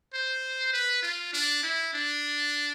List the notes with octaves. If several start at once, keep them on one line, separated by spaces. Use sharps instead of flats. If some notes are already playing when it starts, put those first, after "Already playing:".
C5
B4
F4
D4
E4
D4